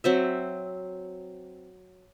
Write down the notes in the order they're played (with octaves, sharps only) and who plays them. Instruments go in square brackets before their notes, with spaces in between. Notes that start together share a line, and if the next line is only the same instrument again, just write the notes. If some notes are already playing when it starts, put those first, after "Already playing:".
[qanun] F#3 C4 E5